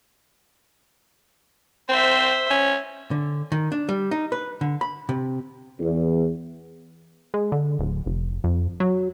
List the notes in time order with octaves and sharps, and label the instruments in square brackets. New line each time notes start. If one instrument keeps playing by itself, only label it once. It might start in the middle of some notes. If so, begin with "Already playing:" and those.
[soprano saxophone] C4 [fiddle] C5 E5
[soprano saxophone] C#4
[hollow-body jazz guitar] D3
D#3
D4
G3
D#4
B4
D3
B5
C3
[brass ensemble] E2
[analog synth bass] G#3
D3
D1
F1
F2
F#3